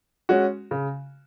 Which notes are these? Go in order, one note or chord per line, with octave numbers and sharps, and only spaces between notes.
G#3 C#4 F#4
C#3